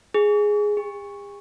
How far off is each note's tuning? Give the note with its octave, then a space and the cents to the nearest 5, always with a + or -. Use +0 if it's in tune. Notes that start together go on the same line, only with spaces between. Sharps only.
G#4 +0
G#4 -45